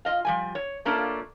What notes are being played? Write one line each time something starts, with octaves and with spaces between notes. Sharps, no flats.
F4 D#5 F5
F3 G3 G#5
C#5
A3 A#3 C#4 D4 F4